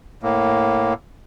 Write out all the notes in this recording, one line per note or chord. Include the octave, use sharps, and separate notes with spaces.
A2 A#3